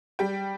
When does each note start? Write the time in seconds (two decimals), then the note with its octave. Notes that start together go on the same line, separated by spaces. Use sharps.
0.19 G3 G5